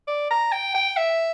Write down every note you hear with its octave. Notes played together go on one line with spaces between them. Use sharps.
D5
A#5
G5
G5
E5